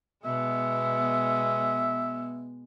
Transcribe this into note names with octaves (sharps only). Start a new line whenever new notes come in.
B2 G#3 B3 E5